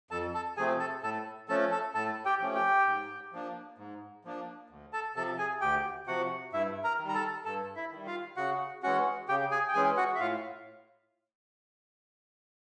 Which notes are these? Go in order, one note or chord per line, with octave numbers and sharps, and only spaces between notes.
F2 A4 A5
A4 A5
C3 F3 A3 C4 G#4 G#5
A4 A5
A2 A4 A5
F3 A3 C#4 A4 A5
A4 A5
A2 A4 A5
G4 G5
F3 A3 C#4
G4 G5
G#2
F3 A#3 D4
G#2
F3 A#3 D4
D2
A4 A5
C3 F3 A4 A5
G#4 G#5
D2 G4 G5
C3 F3 F#4 F#5
G2 E4 E5
A#4 A#5
D#3 G3
A#5
A4 A5
G2 A4 A5
E4 E5
D#3 G3
F4 F5
C#3 F#4 F#5
E3 G#3 C#4 F#4 F#5
C#3 G4 G5
G#4 G#5
G5
E3 G#3 C#4 G#4 G#5
F#4 F#5
E5
A2 F4 F5